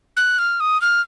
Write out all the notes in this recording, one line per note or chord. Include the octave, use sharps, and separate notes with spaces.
F#6
F6
D#6
F6